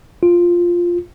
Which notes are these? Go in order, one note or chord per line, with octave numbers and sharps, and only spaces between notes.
F4